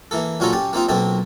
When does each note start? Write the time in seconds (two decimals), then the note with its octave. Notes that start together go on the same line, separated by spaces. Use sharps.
0.11 E3 A#3 A4
0.40 A#2 F#3 C#4 F4 A4 A#4
0.53 C#4 G4 A5
0.73 A#3 C4 D#4 F4
0.89 B1 B2 A#3 C4 A5